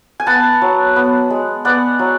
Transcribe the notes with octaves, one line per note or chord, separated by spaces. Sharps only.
G#5
B3 F#5 A5
F#3
B3
G#3
B3 D5 F#5
F#3